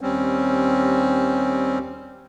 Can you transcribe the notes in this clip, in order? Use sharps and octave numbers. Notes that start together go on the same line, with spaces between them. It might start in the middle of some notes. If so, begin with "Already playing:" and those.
D#2 G3 C4 C#4